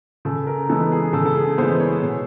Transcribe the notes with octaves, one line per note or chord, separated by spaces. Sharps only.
C#3 A4
A#4
E3 G#3 B3 A4
G#4
C#3 A4
A4
G#4
E3 G#3 B3 C5
C#5
B2 G#4